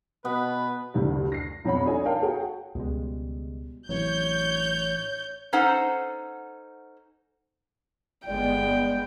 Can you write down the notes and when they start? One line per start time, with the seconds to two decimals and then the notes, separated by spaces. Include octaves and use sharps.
0.25 B2 B3 B4
0.94 F#1 D2 G2
1.32 A#6 C7
1.65 B1 F2 C#4 C#5 F#5 B5
1.85 D4 D#4 F4 A4 C#5 G#5
2.05 A#4 C#5 F5 G5 A5
2.22 F#4 G#4 C#5 F#5 G5
2.75 C#2 B2 G3 G#3
3.89 A1 C3 E3 F#3 C#5 G6
5.53 C#4 D#4 A4 C5 F#5
8.27 G1 G#3 B3 D5 G5